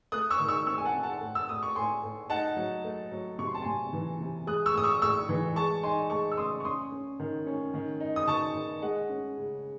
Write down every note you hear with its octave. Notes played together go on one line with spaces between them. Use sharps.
A3 D#6 F#6
C#6 E6
D#3
C#6 E6
C4 C#6 E6
G#5
F#5 A5
C4
F#5 A5
A2
E6
A2 D#6
C#6
A2 G#5 C6
A2
D#4 F#5 A5
F#3
A3
F#3
C3 C#6
C6
A5
C3 G#5 C6
E3
C3
G#3 D#6 F#6
C#6 E6
A2 D#6
C#6 E6
A2 C#6 E6
E3
G#3 A5 C#6
D#4 G#5 C6
G#3 A5 C#6
E6
C#3 C6 D#6
C#6
C#4 C6 D#6
C#4
D#3
C#4
D#3
D#4
D#6
D#3 A5 C#6
D#3
G#3 D#5 F#5
C#4
C#3